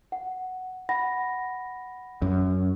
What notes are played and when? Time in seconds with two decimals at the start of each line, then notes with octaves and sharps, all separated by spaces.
0.12 F#5
0.89 F#5 B5 A#6
2.22 F#2